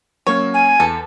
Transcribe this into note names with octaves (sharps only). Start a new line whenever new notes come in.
F#3 A#3 C#4 C#5
G#5
E2 A4